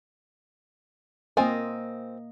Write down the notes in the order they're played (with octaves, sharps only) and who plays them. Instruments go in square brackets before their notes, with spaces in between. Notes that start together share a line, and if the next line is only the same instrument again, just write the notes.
[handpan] A#3 D#5 [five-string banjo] C4 F4 G#5